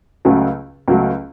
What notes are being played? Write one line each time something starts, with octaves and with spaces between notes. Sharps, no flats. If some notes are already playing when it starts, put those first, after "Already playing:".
C#2 C#3 F#3 A3
C#2 C#3 F#3 A3